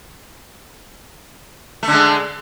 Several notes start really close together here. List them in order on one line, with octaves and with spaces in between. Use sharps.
A3 D3 G#3